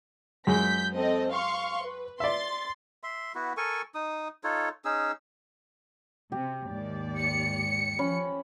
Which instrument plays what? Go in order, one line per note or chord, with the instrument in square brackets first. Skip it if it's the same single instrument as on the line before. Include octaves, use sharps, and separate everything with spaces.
[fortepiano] F#2 G#3 [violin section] G6 B6
[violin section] C4 A4 D#5
F5 C6 C#6
B4
[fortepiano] D5 E5 [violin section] C6 A6
[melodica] E5 C6
B3 E4 F#4
A4 A#4 G#5 C#6
D#4 D#6
D#4 F4 A4 C#5
C#4 D#4 G#4 E6
[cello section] C3 [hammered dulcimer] G4
[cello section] D#2 G#2 D5
[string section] C#7
[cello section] F3 [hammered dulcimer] C#4 B5